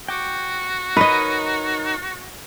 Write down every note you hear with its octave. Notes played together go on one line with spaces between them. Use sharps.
F#4 G5 D6
D#4 A#4 B4 C#5 D#5